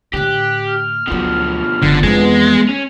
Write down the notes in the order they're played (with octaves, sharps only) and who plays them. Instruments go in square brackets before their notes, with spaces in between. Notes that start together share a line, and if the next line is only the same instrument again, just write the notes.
[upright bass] A2 D3 [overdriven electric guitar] G4 [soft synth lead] F#6
[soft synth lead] F6
[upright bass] D2 F#3 [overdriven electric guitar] B2 F3
[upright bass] F#1 F#2 [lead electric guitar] D3
[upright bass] F2 E3 [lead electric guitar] G#3 [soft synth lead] B3
[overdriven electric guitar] C#4